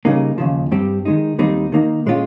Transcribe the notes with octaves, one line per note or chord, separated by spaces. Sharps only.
C#3 G3 A#3 D#4
D#2 C#3 F3
G2 G3 C4 G4
D#3 G#3 D#4
D#2 D#3 G3 C4 D#4
D#3 A#3 D#4
A#2 G#3 C#4 F4